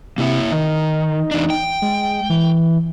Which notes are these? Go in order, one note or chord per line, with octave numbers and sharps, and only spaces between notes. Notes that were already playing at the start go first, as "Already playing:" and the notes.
C3 A#3 E4 E5
D#3 D#4
E2 D4
G5
G#3
E3